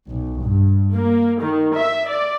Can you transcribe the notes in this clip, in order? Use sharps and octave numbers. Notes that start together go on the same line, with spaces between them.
B1
G2
A#3
D#3
E5
D5